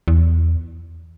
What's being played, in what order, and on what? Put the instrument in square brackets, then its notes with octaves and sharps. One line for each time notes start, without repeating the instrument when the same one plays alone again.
[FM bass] E2